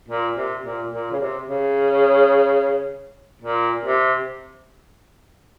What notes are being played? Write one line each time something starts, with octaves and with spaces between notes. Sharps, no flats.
A#2
C3
A#2
A#2
C#3
C3
C#3
A#2
C3